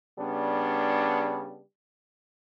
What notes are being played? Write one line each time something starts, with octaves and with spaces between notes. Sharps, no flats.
C#3 G3 B3 D4